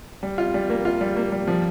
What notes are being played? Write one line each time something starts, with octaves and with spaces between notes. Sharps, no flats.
G3
F4
G3
A#3
F4
G3
A#3
G3
F3